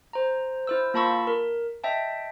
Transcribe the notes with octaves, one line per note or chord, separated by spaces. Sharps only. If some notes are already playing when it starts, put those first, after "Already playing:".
C5 A#5
E4 C5 E6
A#3 F4 A5 B5 C#6 E6
A#4
D#5 E5 G5 A5